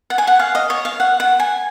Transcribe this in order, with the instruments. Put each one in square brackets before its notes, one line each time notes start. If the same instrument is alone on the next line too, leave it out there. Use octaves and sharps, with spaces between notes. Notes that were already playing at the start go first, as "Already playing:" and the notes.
[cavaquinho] F#5
G#5
F#5
F5
D#5
C#5
F5
F#5
F#5
G#5